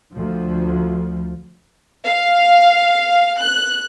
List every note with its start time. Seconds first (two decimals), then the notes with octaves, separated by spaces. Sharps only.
0.14 D2 F3
2.04 F5
3.41 F#6